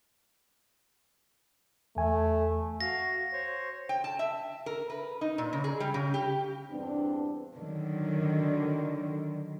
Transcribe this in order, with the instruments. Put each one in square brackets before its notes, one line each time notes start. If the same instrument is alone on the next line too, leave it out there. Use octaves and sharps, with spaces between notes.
[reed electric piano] E2 G#5 [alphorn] A3
[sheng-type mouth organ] F#4 F5 [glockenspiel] A#6
[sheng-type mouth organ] C5 C#5
[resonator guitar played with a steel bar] G5
A5
E5
A#4
B4
D#4
A#2
C#3
G#4
G3
C#3
G4
[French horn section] E2 G2 C4 D4
[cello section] D3 D#3 F#3